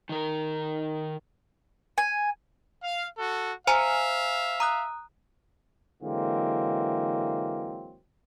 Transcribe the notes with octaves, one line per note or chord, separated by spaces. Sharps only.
D#3 A#4
G#5
F5
F#4 A4
C5 E5 F5 G#5 A#5
A#5 D#6 F#6
D3 E3 F#3 G#3 A#3 C4